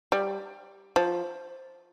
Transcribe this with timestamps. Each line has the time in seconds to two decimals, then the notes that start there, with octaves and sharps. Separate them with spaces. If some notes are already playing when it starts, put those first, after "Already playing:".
0.12 G3
0.96 F3